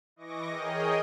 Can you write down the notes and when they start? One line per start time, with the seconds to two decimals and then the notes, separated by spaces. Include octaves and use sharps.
0.16 E3 D#5 C#6 D6 A#6
0.49 G#4 A#4 C#5 D#5 G5 D#6